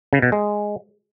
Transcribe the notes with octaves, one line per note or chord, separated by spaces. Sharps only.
C#3
B2
G#3